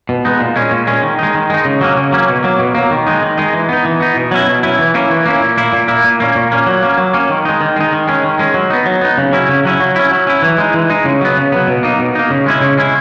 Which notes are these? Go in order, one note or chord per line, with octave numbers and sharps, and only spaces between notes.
B2
G#3 B3 D#4
A#2
G#3 C#4
A#2
G#3 C#4
D#3
G#3 D#4
D#3
G#3 D#4
C#3
F#3 A#3 C#4
C#3
F#3 A#3 C#4
B2
F#3 A#3
B2
F#3 A#3
D#3
G#3 D#4
D#3
G#3 D#4
E3
B3 D#4
E3
B3 D#4
B2
F#3 C#4 E4
B2
F#3 C#4 E4
E3
A#3 C#4 E4
E3
A#3 C#4 E4
A#2
A#3 E4
A#2
A#3 E4
A#2
A#3 C#4
A#2
A#3 C#4
F#3
A#3 C#4
F#3
A#3 C#4
D#3
G#3 D#4
D#3
G#3 D#4
D#3
G#3 C#4
D#3
G#3 C#4
F#3
B3 D#4
F#3
B3 D#4
C#3
F#3 C#4 E4
C#3
F#3 C#4 E4
F#3
C#4 E4
F#3
C#4 E4
E3
G#3 D#4
E3
G#3 D#4
C#3
F#3 B3
C#3
F#3 B3
B2
A#3 D#4
B2
A#3 D#4
C#3
G#3 C#4 E4
C#3
G#3 C#4 E4